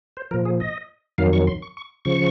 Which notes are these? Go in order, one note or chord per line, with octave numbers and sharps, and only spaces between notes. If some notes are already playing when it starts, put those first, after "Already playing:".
C5
A#2 F3 A#4
G#4
D#5
F2 D#3 F#3 F5
C#6
C6
C#6
C#6
C#3 F3 C#6